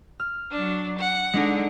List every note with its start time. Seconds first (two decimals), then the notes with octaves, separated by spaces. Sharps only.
0.20 F6
0.51 F#3 D4
0.98 F#5
1.33 D3 G#3 D4 D#4